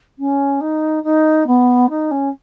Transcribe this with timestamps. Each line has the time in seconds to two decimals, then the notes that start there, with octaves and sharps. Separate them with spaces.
0.18 C#4
0.60 D#4
1.03 D#4
1.46 B3
1.89 D#4
2.11 C#4